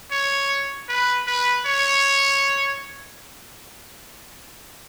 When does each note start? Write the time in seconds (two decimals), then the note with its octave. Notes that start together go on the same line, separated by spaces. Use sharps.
0.11 C#5
0.89 B4
1.27 B4
1.66 C#5